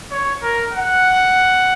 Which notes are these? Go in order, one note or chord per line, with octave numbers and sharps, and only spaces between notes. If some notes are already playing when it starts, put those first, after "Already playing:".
C#5
A#4
F#5